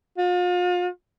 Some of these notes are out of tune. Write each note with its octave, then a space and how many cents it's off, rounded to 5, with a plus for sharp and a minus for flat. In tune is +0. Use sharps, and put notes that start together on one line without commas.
F4 +40